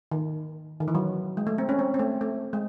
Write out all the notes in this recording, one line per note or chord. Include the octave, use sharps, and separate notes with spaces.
D#3
D#3
E3
F#3
G#3
A3
C4
C#4
C4
C4
A3
A3
G#3